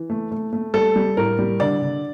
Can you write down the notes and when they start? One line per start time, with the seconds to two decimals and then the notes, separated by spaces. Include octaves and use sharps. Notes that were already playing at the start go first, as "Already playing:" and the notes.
Already playing: E3
0.10 A3
0.31 A3
0.53 A3
0.74 G3 A4
0.96 G3
1.17 A2 A#4
1.39 G3
1.60 D3 D5
1.82 D3